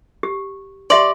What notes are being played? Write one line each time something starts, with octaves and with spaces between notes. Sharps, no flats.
G4
G4 D5 E5 C6